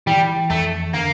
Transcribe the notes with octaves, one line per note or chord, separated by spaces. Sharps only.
E3 G3
F2 A3
D3 A#3